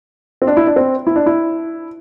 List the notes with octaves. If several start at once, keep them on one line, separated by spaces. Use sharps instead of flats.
C4
D4
E4
D4
C4
E4
D4
E4